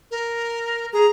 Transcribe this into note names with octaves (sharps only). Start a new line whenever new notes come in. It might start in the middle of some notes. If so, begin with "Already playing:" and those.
A#4
G#4 A#5